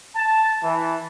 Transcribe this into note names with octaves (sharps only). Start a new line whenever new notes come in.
A5
E3